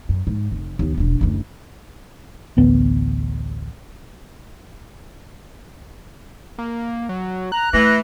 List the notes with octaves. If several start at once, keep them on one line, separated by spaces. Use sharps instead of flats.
F#2
G#2
F1
D#2 B3
E1 D4
F#1 D2
A1 D2 B3
A#3
F#3
A#5 F#6
E3 A3 A#6